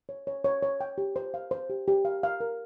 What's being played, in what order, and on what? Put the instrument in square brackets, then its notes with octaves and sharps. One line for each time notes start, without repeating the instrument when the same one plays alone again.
[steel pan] C#5
C#5
C#5
C#5
G5
G4
C5
F5
C5
G4
G4
F5
F5
A#4